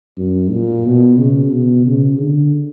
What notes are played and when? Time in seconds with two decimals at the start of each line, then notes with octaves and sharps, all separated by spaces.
0.18 F#2
0.51 A#2
0.85 B2
1.18 C#3
1.51 B2
1.86 C#3
2.19 D3